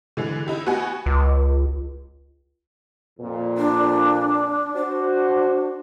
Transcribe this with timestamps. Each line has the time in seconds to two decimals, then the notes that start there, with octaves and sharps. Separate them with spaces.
0.17 D3 E3 G#3 G#4
0.46 D#4 E4 G4
0.66 B3 F#4 G4 F#5 G#5
1.06 C#2
3.20 F2 A#2
3.57 D4
4.75 D4 F#4 C5